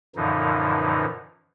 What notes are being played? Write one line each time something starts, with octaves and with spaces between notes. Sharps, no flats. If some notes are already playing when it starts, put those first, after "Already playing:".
F#2 A#2 D3 E3 F3 D#4